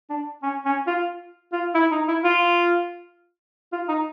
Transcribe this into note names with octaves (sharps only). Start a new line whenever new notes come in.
D4
C#4
C#4
F4
F4
E4
D#4
E4
F4
F4
D#4